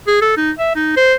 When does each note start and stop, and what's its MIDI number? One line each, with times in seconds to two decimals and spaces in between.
0.07 0.20 68
0.22 0.36 69
0.37 0.51 63
0.59 0.74 76
0.75 0.95 63
0.97 1.15 72